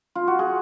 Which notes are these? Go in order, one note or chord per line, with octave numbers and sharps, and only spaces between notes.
F4
F#4
G#4